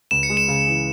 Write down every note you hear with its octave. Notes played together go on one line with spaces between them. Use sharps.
C#2 E7
C#7
G#3
E7
C#3
E3